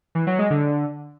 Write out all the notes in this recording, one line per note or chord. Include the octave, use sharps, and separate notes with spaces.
E3
F#3
G#3
D3